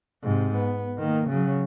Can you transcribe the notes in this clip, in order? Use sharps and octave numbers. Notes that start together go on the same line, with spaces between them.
G#2 C3
B3
D#3 A#3
C#3 F#3